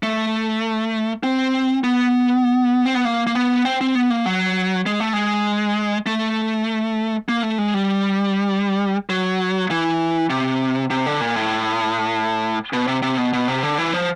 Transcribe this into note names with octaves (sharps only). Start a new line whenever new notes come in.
A3
C4
B3
C4
B3
A#3
A#3
B3
C4
C4
B3
A#3
F#3
G#3
A3
G#3
A3
A#3
A3
G#3
G3
F#3
E3
C3
C3
D3
A#2
A2
B2
C3
C3
B2
B2
C3
D3
E3
F3